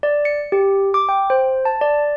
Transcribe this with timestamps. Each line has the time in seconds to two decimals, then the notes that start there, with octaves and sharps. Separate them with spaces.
0.03 D5
0.25 C#7
0.52 G4
0.94 D6
1.09 G5
1.30 C5
1.65 A5
1.81 D5